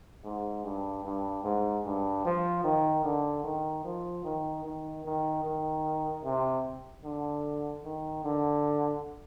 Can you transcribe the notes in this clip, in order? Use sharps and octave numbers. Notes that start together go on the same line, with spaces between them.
G#2
G2
G2
G#2
G2
F3
D#3
D3
D#3
F3
D#3
D#3
D#3
D#3
C3
D3
D#3
D3